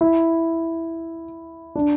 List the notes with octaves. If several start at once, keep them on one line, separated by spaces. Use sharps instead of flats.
E4
D4